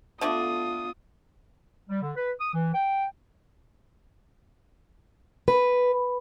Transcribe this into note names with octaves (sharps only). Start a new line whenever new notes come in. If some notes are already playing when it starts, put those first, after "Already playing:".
D3 A3 B3 D4 F4 D#6
G3
D3
B4
D#6
E3
G5
B4